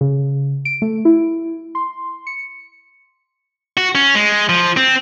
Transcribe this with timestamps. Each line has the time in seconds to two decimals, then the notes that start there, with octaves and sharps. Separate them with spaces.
0.01 C#3
0.65 D7
0.82 A3
1.05 E4
1.75 C6
2.27 C#7
3.77 F#4
3.95 C#4
4.15 G#3
4.49 F3
4.77 C4